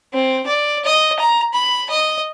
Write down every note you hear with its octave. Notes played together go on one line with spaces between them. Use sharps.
C4
D5
D#5
A#5
B5
D#5